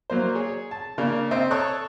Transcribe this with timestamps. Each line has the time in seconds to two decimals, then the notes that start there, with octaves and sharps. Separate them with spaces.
0.10 F#3 A#3 C5
0.35 G#4 C#5
0.71 A5
0.98 C#3 A#3 D4
1.31 C4 C5 D#5 E5
1.51 A4 C#5 A5 C#6 D#6 F#6